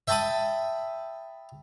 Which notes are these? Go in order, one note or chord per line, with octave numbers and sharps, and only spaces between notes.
E5 G5 A5 B5 D#6